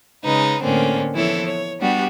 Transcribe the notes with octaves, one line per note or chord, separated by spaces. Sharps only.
C#3 G#3 D#4 B4
A2 D3 A#3 C4 C#4
E3 F3 B3 E4 A4 C#5
C#5
G3 B3 D4 F#4 G4